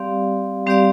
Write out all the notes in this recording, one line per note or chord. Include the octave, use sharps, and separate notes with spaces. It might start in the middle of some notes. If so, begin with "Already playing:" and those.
Already playing: G3 C4 G4 D5 F5
G3 C4 G4 D5 F5